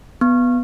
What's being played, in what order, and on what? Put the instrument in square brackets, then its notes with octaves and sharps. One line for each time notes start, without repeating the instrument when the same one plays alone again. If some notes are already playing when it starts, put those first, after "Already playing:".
[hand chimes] B3